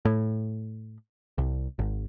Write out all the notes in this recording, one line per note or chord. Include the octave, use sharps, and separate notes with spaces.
A2
C2
G#1